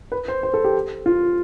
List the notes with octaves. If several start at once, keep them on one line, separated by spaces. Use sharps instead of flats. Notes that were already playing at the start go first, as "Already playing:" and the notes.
B4
C5
C5
A4
G4
F4